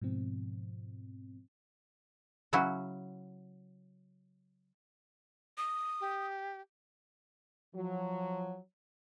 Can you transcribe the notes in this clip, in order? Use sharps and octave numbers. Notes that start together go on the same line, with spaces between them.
G#2 B2 F3 C4
C#3 F#3 C#4 E4 F#4
D#6
G4
F3 F#3